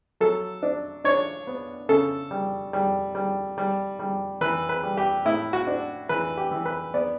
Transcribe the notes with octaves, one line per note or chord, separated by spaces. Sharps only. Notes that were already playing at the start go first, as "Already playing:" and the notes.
F#3 A4
D4
D4 C#5
B3
C#3 A4
G3
G3
G3
G3
G3
E3 B4
B4
G3
G4
A2 E4
F#4
D4
E3 B4
G4
E3
B4
B3 D5